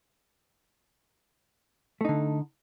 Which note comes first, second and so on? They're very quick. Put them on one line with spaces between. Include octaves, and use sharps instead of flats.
A3 D#4 D3